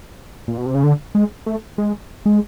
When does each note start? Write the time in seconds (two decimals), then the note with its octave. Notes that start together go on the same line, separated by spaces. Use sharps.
0.48 A#2
0.57 B2
0.66 C3
0.75 C#3
0.84 D3
1.15 G#3
1.46 A3
1.78 G#3
2.26 G#3